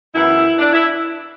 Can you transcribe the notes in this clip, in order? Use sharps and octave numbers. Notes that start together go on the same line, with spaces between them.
F#2 E3 B3 E4
D4
E4